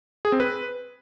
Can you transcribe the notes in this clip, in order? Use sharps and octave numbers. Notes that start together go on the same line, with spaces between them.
G#4
C4
B4